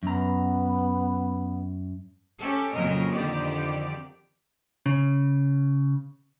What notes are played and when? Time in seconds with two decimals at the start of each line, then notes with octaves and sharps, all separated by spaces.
0.03 F#2 B3 A#5
2.38 C#4 G4 A4
2.73 F2 A#2 C#3 F#3 A#4 D#5
3.13 F2 D3 D#3 G4 D5
4.86 C#3